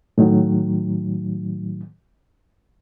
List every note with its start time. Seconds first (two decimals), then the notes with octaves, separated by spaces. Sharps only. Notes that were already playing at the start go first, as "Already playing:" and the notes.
0.18 A2 D#3 F#3